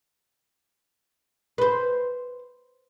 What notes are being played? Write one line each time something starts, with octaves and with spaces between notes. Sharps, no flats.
B4 C5